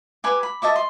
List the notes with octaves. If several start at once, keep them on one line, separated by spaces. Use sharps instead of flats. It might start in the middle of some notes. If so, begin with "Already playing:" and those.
G4 B4 G#5
B5
A4 D#5 E5 D6
C6